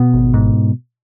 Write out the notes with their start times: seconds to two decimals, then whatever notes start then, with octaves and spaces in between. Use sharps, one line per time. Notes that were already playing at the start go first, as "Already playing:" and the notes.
Already playing: B2 B3
0.13 G#1
0.34 G#2